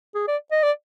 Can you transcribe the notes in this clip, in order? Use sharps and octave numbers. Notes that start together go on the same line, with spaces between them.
G#4
D5
D#5
D5